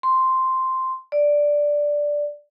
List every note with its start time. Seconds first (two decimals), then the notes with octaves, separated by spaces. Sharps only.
0.03 C6
1.12 D5